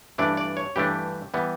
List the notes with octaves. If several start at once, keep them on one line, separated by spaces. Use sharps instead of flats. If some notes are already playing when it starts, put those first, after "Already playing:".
G2 E3 A3 D4 D5
D5
C#5
G2 E3 A3 D4 G4
E3 G3 B3